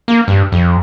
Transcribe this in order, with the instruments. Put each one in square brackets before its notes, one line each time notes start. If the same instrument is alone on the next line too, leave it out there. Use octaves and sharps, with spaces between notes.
[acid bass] A#3
G2
F2